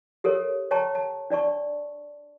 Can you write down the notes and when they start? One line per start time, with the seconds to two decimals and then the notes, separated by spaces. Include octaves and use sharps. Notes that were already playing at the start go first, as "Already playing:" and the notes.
0.24 G4 A4 A#4 C#5
0.71 C#5 G5 A5 A#5 C#6
0.95 A5
1.30 D4 D5 A5 C#6